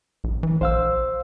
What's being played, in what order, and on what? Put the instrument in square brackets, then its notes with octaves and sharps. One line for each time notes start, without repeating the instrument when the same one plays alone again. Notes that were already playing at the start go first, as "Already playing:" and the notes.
[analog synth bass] A#1
E3
[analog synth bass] A#1 [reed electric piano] C5 F5 E6